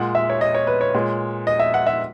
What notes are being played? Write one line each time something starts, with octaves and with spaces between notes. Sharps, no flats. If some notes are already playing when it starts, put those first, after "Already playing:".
Already playing: A#2 G#3 F#5
E5
C#5
D#5
C#5
B4
C#5
A#2 G#3
D#5
E5
F#5
E5